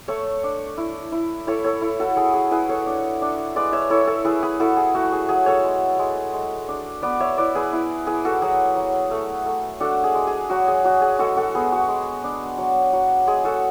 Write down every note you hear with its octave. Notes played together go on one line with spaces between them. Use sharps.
A3 A4 C#5
D4
E4
E4
E4 A4 C#5
A4 C#5
E4
F#4 A4
E4 G#4
G#4
E4 G#4 B4
A4 C#5
D4
D4
G#3 B4 D5
C#5 E5
E4 A4 C#5
A4 C#5
E4 G#4 B4
G#4 B4
E4 F#4 A4
G#4
A3 F#4
G#4
F#3 G#4
A4 C#5
G#3
G#3
G#3
D4
B3 B4 D5
C#5 E5
E4 B4 D5
G#4 B4
E4
E4 G#4 B4
F#4 A4
F#3 G#4
F#3
A3
A3
D4 F#4 A4
G#4
G#3
G#4
F#3 F#4
G#4
F#3 F#4
G#4
G#3 F#4 A4
F#4 A4
B3 G#4
F#4
G#3
D4
F#3
F#3
G#3 G#4
F#4 A4